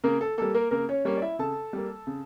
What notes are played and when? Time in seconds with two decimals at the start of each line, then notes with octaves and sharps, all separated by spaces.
0.04 C#3 A#3 A#4
0.21 A4
0.38 G3 A#3 A4
0.54 A#3 A#4
0.71 C#3 A#3 A#4
0.89 C#4 C#5
1.05 G3 A#3 C#4 C#5
1.17 D5
1.22 E4 E5
1.39 C#3 A4 A5
1.73 G3 A#3
2.07 C#3